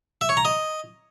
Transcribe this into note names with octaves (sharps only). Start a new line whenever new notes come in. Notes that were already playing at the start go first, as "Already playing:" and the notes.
E5
C#5
A#5
D#5